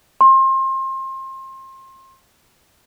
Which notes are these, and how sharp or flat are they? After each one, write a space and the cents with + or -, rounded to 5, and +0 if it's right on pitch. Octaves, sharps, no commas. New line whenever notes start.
C6 +30